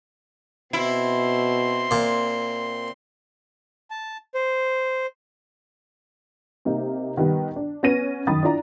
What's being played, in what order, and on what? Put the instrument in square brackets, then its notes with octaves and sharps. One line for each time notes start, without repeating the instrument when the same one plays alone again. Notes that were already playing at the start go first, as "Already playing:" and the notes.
[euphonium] B2 [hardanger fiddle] C4 C6 [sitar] E4
[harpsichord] A#2
[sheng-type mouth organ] A5
C5
[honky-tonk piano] C3 A#3 D#4
D#3 G3 B3 B4
D4
B3 C#4 A#6 D#7
F#2 D#3 B5 D#6 A6
D4 E4 F4 D5 A#5